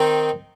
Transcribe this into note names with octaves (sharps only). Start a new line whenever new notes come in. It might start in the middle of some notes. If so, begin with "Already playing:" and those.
Already playing: D#3 C4 D#4